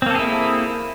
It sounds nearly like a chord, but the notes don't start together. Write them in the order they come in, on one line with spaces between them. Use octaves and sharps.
C4 A#3 A4 G#4 E4